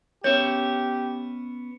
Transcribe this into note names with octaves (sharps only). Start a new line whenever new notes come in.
B3 C#4 G4 C#5 E5